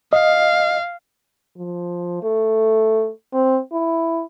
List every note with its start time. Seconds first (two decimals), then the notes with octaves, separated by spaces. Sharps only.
0.13 D#5 F5
1.58 F3
2.23 A3
3.33 C4
3.72 E4